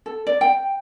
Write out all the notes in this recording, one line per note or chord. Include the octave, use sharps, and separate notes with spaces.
A4
D5
G5